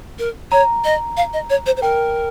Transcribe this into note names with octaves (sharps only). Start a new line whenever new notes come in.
A#4
C#5 A#5
D#5
F5
D#5
C#5
C5
C5
A#4 G5